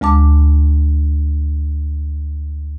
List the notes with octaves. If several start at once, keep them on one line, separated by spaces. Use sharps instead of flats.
D2 G#3 A5 D6